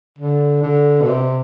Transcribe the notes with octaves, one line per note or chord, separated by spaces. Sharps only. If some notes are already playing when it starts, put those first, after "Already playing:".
D3
D3
B2
C3